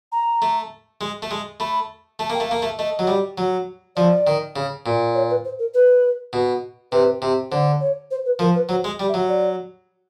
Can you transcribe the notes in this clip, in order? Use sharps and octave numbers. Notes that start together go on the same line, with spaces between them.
A#5
A3
G#3
A3
G#3
A3 B5
A3 A5
A#3 G5
A3
F5
A#3
A3 E5
A3 D#5
F#3
G3
F#3
F3 D5
D#3
C#3
A#2
C#5
B4
C5
A#4
B4
B2
C3 B4
C3
D3 C5
C#5
C5
B4
F3 A#4
B4
F#3 C5
G#3
G3
E5
F#3
D5